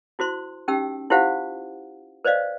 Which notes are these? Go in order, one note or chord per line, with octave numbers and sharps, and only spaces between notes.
E4 F#4 C5 C6
C#4 D#4 G4 G5 E6
E4 F4 G4 C5 F5 F#5
B4 C5 D5 D#5 F5